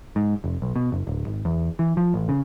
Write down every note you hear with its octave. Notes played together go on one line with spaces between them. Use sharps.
G#2
F1
B1
B2
F#1
D1
G#1
E2
E3
F3
A1
C#3